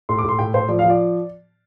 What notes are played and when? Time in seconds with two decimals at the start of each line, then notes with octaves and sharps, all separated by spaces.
0.09 A2 C6
0.18 D6
0.24 A2 C6
0.39 A2 G5
0.54 A2 C5
0.69 F3 D5
0.79 F5
0.84 F3
0.90 D5